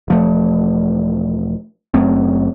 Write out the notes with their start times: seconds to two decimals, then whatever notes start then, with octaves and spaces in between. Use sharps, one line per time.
0.08 E1 F3 A3
1.94 F#1 F#2 A3 C4